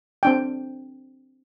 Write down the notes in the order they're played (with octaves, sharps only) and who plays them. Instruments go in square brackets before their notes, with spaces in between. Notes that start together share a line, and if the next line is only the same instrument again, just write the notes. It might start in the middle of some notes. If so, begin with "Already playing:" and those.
[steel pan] C4 D4 G5